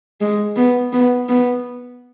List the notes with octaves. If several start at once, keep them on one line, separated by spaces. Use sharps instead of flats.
G#3
B3
B3
B3